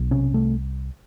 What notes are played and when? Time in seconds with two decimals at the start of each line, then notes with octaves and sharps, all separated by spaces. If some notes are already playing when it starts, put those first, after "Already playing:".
Already playing: B1
0.11 C3 C#4
0.34 C2 A3